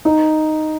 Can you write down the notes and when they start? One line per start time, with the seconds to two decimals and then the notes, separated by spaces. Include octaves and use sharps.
0.05 D#4